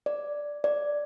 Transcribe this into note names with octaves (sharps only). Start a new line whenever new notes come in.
D5
D5